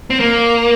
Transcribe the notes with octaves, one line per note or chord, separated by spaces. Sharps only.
C4
A#3